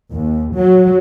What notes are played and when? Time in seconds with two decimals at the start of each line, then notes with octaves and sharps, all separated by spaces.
0.11 D#2
0.53 F#3